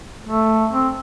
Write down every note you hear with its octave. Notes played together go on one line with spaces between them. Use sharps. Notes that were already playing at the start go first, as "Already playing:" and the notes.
A3
C4